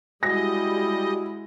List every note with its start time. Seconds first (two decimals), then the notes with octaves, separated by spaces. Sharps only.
0.23 G3 G#3 E4 F#4 D#5 F#5 G#5 A#6